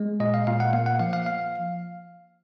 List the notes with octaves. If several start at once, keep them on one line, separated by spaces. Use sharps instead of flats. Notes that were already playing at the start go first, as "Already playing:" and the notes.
Already playing: G#3
A#2 D#5
F5
A#2 F5
F#5
A#3 F5
F#5
F3 F5
F5
F5